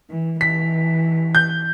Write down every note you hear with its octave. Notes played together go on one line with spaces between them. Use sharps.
E3
E3 B6
G6